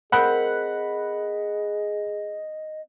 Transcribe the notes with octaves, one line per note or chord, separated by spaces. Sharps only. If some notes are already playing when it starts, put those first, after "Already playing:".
C4 G#4 A#4 C5 D#5 F#5 B5 F#6